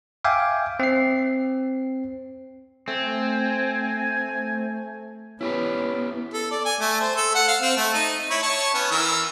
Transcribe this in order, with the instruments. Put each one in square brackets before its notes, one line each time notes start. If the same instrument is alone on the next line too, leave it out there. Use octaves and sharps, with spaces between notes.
[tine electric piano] E5 F5 G5 G#5 D6
C4 C7
[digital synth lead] A3 [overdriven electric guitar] C4 [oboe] G#5
[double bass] B3 [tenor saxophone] C#4 [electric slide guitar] E4 G4 B4
[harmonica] A4
D5
G#5
A3
C5
A4
F#5
F5
C4
A3
D#4
E4 C#5
C#5 A5 C#6
B3 C#4
E3 A#4 E6